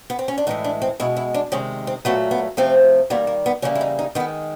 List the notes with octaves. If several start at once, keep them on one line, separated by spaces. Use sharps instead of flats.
B3
C4
C#4
D4
A2 E3 G#3 D#4
D4
C4
B2 G#3 E4
E4
D4
C3 D#3 G#3 C#4
C4
A#2 F#3 A3 B3
B3
C3 F3 A3 C4
D#3 G3 A#3 B3
A#3
B3
C#3 E3 G3 A#3 C#4
E4
D#4
D#4
D#3 G#3 B3